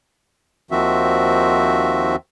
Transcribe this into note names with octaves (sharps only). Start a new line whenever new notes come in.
D#2 D#3 F3 C4 F#4 E5